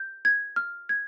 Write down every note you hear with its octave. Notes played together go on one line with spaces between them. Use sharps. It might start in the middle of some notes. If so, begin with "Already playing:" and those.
Already playing: G6
G#6
F6
G#6